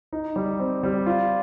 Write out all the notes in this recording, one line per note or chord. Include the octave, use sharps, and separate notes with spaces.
D#4
G3
C4
G3
F4